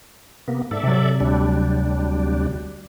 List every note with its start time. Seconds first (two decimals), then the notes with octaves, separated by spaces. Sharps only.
0.48 C3 A#3 B3
0.71 G#2 A4 D5 E5
0.83 C3 F#3
1.20 D2 G3 D4